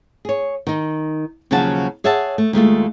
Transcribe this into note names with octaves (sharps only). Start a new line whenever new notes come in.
G#4 C#5
D#3 D#4
D#2 C#3 F3 F#3 F#4 A5
G#4 C#5 E5 F#5 A5
A3
D#2 G#3 A3 F4